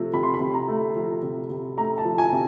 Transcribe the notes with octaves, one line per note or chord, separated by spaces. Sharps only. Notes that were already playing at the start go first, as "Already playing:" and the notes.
Already playing: C3 F3 A3
C3 B5
C6
B5
C3
A#5
A3
F3
C3
C3
A3 A#5
A5
F3
G#5
C3